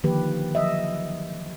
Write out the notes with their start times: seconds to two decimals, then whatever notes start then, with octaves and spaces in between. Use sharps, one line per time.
0.04 D3 D#3 F3 A#3 G4 B4
0.55 F3 F#3 D#5 E5